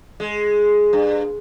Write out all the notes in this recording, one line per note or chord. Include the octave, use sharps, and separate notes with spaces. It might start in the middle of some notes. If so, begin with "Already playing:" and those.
G#3
G2